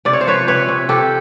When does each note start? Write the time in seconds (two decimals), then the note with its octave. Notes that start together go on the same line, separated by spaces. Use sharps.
0.05 C3 D5
0.13 C#5
0.21 C5
0.26 F3 B4 C#5
0.47 C3 B4 C#5
0.68 C3
0.89 C3 G4 A4